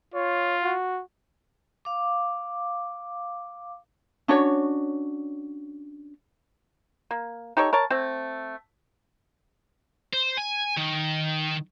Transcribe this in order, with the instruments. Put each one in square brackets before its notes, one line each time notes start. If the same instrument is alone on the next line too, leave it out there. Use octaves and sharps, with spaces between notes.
[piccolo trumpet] F4 [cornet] C#5
[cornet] F#4
[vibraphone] F5 D6
[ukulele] C#4 D4 F#4 C#5
[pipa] A#3
D#4 G4 A4 C#5
A#4 C#5 A5
A3 C4
[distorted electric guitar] C5
G#5
D#3